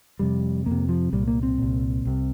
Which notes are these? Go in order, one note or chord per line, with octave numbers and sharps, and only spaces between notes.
F2 C3 G3
F2 C3 A#3
F3
C2 A#2 G3
A#3
C4
C2 A#2
C2 C3